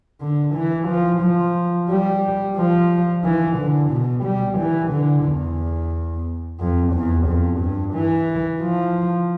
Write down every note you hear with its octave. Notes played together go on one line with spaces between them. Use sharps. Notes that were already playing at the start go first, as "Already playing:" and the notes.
D3
E3
F3
F3
G3
F3
E3
D3
B2
G3
E3
D3
E2
F2
E2
F2
G2
E3
F3